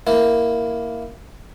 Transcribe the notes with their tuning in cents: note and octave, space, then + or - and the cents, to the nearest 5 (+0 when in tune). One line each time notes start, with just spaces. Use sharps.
A#3 +0 E4 +0